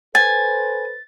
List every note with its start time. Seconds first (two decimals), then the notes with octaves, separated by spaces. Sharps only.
0.15 A4 B4 C5 G#5 A6